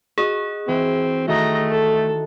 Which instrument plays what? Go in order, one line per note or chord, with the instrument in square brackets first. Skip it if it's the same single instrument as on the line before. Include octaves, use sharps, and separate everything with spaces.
[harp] F#4 D#5 [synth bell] G#4
[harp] E3 [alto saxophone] C4
[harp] D#3 E4 F#4 [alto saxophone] A3 [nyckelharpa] D#5 A#5
[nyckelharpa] A4